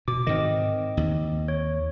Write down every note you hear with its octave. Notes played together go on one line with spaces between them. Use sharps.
B2 D6
G#2 D#3 C4 D#5
D#2
C#5